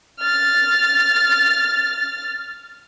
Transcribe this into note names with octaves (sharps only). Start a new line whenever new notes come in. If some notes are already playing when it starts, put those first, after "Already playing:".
F6 A6